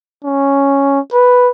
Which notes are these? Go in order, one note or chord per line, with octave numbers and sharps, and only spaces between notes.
C#4
B4